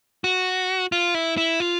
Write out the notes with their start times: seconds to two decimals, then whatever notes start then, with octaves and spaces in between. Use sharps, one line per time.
0.24 F#4
0.92 F4
1.14 E4
1.37 E4
1.60 F4